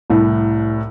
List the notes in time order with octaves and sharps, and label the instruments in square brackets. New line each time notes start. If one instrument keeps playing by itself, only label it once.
[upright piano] C2 A2